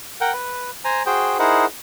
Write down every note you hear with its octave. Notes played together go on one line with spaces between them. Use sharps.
A#4 F#5 G5
B4
C5 G#5 A#5
F#4 G#4 C5 G5
D#4 E4 G#4 A#4 C5 F#5